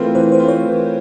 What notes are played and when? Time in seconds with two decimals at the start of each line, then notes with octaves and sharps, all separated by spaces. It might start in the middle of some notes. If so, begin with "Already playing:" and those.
Already playing: E3 A3 C4 F4 A#4 B4
0.15 E3 C5
0.32 C5
0.39 A3 C4 F4
0.48 C#5
0.64 E3